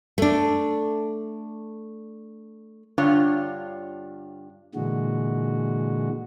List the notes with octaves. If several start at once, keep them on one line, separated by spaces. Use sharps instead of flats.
A3 D4
G2 D3 D4 F4 C#5
A#2 D3 E3 G#3 F#4